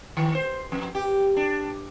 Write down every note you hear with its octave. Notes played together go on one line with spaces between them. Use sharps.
D#3
C5
F2
G4
D4